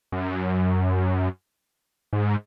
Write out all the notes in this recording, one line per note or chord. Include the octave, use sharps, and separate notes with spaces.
F#2
G#2